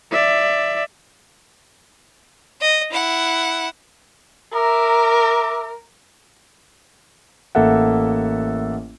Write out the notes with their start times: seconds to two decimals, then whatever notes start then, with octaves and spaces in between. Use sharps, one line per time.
0.11 D5 E5
2.61 D#5
2.91 E4 F#5
4.53 A#4 E5 A#5 D6
7.55 A1 A#3 A4 E5 F#5